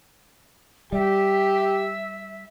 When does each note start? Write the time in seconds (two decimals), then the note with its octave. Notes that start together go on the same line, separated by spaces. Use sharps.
0.92 G3 G4 E5